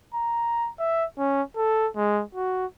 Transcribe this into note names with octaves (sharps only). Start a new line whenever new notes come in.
A#5
E5
C#4
A4
G#3
F#4